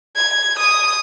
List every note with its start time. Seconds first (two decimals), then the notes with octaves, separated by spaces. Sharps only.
0.16 G#6
0.59 D#6